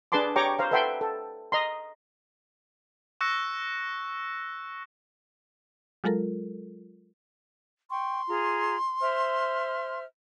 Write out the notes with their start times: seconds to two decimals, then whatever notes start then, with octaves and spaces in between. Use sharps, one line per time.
0.12 D4 G#4 B4 A5 C6 D6
0.36 G4 C#5 G5 A#5 C#6 D6
0.59 C5 F5 A#5
0.71 A4 B4 E5 F#5 G5 C6
1.01 A4
1.52 D#5 A#5 C6
3.21 C#6 E6 F#6 A#6 C#7
6.04 F#3 G#3 F4 A4 A#4
7.90 G5 C6 C#6
8.27 F4 G#4 A#5
9.01 C5 E5 F6